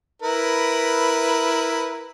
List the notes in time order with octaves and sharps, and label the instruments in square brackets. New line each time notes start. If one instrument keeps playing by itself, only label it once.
[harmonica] E4 A#4 B4